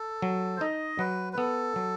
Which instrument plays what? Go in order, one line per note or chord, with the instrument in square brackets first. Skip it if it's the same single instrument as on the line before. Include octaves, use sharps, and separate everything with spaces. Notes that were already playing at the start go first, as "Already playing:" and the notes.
Already playing: [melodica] A4
[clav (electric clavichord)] F#3
[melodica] C5
[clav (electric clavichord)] D#4 [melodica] D#5
[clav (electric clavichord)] F#3 [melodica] B4
[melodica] B4
[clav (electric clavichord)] B3 [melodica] A4
[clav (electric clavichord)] F#3